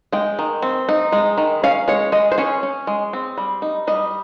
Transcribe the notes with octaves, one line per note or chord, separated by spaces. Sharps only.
G#3 G5
D#3
C4
D#4
G#3
D#3
C#4 F5
G#3 C#5
G#3 D#5
C5
C#4 C#5
C#4
G#3
C4
G3
D#4
G3 D#5